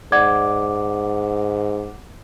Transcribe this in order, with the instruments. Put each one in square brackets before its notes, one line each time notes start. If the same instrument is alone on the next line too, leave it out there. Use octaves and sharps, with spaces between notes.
[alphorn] G#2 [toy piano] D5 [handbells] F#5 D6